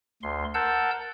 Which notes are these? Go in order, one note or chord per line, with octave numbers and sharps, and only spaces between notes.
D2 C6
A#4 F#5 A5 E6 G6